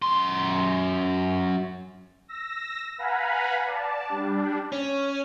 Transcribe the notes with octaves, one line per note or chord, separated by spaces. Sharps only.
F#2 C6
E6 A#6
B4 F5 F#5 G#5 A#5 B5
D5 A5
G3 D4
C#4